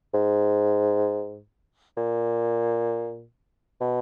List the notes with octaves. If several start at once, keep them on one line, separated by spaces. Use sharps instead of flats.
G#2
A#2
B2